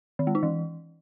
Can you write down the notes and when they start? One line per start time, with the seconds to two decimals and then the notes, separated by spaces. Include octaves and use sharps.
0.19 D#3
0.27 G#3
0.35 D#4
0.43 E3